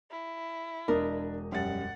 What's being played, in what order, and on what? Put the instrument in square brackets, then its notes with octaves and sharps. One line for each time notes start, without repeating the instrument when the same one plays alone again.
[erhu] E4
[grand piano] E1 D#5 D#6 [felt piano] D4 [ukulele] A#4
[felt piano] F#2 G3 A6 [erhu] F#5